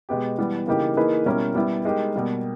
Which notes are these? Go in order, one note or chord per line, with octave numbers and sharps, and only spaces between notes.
B2 G#3 B3 G4
E3 G3 B3
C#3 E3 A#3 D#4 G4
E3 A#3 D#4 G#4 B4
B2 G3 C#4 E4 A#4
G3 B3 E4
G#3 D#4 G4 A#4
B2 G3 A#3